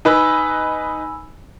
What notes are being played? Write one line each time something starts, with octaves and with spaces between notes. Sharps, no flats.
D#4 B4 G#5 B5 E6